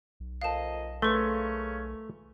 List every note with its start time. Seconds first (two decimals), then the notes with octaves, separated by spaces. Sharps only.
0.20 B1
0.42 F2 A#2 D#5 F5 A5
1.02 C#3 A3 A#3 C#4 B4 C6